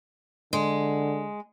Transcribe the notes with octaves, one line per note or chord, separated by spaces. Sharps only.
D3 G#3